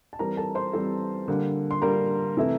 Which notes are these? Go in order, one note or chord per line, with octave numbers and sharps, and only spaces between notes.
A5
E3 G3 C4 A#4 A#5
A4 A5
C5 C6
E3 G3 C4 A4 A5
D3 G3 A#3
C6
D3 G3 A#3 A#4 A#5
C3 E3 A3 E4